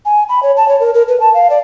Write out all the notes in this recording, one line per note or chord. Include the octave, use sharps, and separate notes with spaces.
G#5
B5
C#5
A5
C#5
A#4
A#4
B4
A5
F5
D5